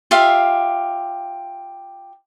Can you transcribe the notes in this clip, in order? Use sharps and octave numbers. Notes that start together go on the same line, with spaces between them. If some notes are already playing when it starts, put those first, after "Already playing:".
F4 G4 E5 F5